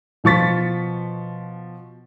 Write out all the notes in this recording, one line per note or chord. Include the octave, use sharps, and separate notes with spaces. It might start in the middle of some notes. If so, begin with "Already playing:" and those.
B2 F3 C#6 A6 B6